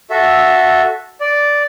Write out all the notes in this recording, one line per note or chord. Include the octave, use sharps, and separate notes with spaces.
F#4 A4 E5
D5